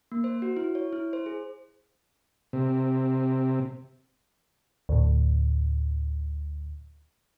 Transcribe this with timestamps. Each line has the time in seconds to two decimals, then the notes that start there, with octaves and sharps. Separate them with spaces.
0.12 A#3
0.24 C5
0.42 F#4
0.57 E4
0.75 C#5
0.93 E4
1.13 C5
1.26 G#4
2.53 C3
4.89 D2 A2